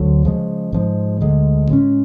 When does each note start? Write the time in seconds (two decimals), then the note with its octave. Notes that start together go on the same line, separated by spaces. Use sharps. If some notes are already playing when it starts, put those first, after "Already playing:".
Already playing: D2 D3 F#3
0.25 C#3 F3 G#3
0.72 G#2 F3 G#3
1.21 D2 D3 G#3
1.69 A2 G#3 C#4